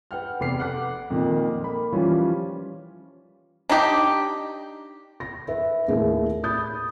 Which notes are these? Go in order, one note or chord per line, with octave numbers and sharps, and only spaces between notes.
B4 F#5 G5 F6
F1 B3 D6 F6 C7
F#5 D6 F#6 C7
F2 A#2 D#3
A#3 B5
E3 F3 G3 C#4 F4
D4 D#4 G4
A#6
B4 E5
D#2 A2 G#4 E5
B5 D#6 G6 A6